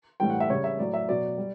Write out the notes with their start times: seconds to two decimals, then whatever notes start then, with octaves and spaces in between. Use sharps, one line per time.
0.20 A2 E3 G3 G5
0.30 F#5
0.40 E5
0.50 C#3 G3 C#5
0.64 E5
0.79 A2 F#3 D5
0.94 E5
1.08 B2 F#3 D5
1.38 G3